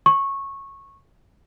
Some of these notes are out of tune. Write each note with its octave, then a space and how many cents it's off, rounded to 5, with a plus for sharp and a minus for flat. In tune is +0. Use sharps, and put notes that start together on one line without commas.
C#6 -15